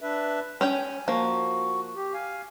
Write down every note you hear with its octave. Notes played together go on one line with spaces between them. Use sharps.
D4 B4 E5
C#4 C#5 G5 G#5
F3 A#3 F#4
G4
F5 G#5